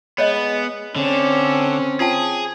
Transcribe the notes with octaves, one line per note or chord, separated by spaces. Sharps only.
G#3 B3 C#5 D#5
D3 C4 C#4
F4 G#4 G5 A5